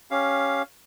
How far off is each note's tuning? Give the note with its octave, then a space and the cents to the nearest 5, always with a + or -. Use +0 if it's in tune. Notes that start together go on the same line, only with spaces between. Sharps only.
C#4 +0 G4 +0 F5 +0